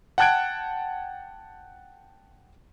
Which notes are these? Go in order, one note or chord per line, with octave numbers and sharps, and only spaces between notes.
F#5 G5 A5 F#6 G#6 D7